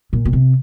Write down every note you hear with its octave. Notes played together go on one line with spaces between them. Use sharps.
A#2
B2
C3